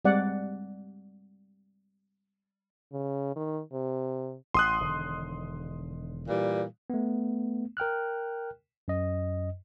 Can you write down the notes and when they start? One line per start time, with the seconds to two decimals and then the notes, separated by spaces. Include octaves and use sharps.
0.05 G3 G#3 C4 D5 F#5
2.92 C#3
3.36 D#3
3.73 C3
4.54 A1 C6 D#6 F#6
4.81 E1 D3 D#3
6.28 A#2 E3 G3
6.90 A3 B3
7.77 A#4 G5 F6 F#6
8.88 F#2 D#5